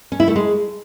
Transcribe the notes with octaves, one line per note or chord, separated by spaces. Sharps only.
C#4
E4
A3
G#3